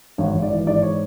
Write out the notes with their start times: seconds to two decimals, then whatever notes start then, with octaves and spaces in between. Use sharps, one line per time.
0.18 G#1 C#5
0.34 G#1
0.42 D5
0.50 E3
0.67 G#2 D5
0.82 C#5